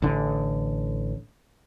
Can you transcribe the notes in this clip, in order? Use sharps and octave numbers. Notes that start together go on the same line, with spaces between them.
A1 D3